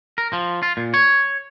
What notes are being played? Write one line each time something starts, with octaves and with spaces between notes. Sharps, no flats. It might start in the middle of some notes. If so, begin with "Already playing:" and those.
A#4
F3
F4
A#2
C#5